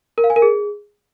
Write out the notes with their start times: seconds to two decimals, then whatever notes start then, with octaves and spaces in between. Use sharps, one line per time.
0.18 A#4
0.24 F5
0.30 G#5
0.36 A#4
0.42 G#4